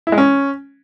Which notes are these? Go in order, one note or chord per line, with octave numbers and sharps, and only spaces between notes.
E4
G#3
C#4